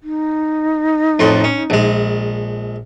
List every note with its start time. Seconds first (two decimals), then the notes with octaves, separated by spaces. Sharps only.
0.03 D#4
1.19 F2 A2 C6
1.44 C#4
1.70 A#1 G#3